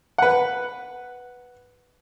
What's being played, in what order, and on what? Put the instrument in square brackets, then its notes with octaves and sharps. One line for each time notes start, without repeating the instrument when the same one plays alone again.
[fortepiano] B4 F#5